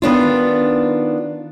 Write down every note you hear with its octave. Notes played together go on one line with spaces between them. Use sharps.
D#3 B3 D4 F4